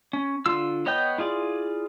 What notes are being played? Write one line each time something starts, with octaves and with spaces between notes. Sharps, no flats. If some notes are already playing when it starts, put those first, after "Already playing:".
C#4
D3 F4 E6
B3 C#5 D#5 G5 G6
E4 F4 G#4 D5